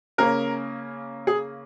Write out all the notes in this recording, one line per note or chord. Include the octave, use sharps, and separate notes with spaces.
C#3 A#3 C#4 A#4
G#4